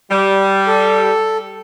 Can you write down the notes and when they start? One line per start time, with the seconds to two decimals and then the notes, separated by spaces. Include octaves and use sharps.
0.11 G3
0.67 A4